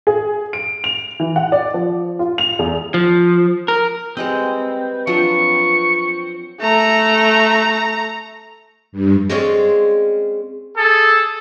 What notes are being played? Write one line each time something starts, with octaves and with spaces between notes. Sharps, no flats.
G#4
D7
F7
E3
F#5
D5
F3
F4
F7
E2
F3
A#4
G3 G#3 C4 B4 D#5
F3 F#3 D4 C#6
A3 A#5
G2
G#3 C4 C#4 C#5 D5 F5
G#4 A4